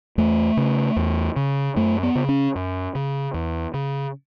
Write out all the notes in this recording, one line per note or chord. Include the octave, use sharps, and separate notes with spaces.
E2 A3
C#3
E2
C#3
F#2 A3
B3
C#3
C#4
F#2
C#3
E2
C#3